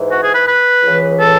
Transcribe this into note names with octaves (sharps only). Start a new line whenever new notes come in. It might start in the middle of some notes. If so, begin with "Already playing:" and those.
Already playing: G#2 E3
F#4
G#4
B4
B4
C#2 C#3 E3
A4